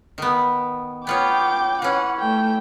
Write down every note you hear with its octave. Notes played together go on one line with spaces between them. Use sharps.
D#3 B3
B3 F4 C#5 G5 D6
E3 C#4 F#5
A3 G5